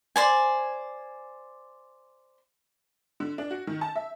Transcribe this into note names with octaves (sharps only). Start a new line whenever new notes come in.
C5 D5 G#5
D3
D4
F#4
D#3
A5
E5